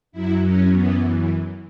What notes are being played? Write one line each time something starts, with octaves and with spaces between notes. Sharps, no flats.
F#2 F#3 E4
C#4
F#2 E3 B3